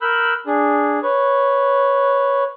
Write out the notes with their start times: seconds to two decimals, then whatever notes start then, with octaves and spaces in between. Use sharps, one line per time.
0.02 A#4 B5 E6 F#6 G6
0.47 D4 G#4
1.03 B4 C#5